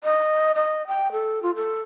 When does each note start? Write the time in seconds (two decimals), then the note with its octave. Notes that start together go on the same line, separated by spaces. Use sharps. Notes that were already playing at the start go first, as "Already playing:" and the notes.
0.04 D#5
0.55 D#5
0.88 G5
1.12 A4
1.43 F4
1.56 A4